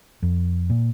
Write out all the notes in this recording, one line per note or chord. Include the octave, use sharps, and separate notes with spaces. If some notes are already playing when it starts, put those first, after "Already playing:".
F2
A#2